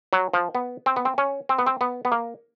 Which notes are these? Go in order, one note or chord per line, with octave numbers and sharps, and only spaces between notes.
F#3
F3
B3
C4
B3
C4
C#4
C4
B3
C4
B3
B3
A#3